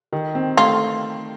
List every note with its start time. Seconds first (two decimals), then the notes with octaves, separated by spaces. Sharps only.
0.13 D#3
0.35 C4
0.57 A3 F4